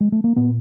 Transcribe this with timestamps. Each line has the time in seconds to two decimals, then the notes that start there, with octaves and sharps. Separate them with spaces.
0.01 G#3
0.12 A3
0.24 A#3
0.36 A#2 B3